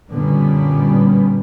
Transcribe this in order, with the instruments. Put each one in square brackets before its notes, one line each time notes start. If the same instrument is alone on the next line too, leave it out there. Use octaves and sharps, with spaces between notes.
[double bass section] F#2 A#2 D3 G3 B3 C#4